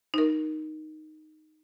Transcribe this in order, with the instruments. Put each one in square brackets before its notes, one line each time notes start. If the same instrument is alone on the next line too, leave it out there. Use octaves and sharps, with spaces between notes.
[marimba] D#4 A#4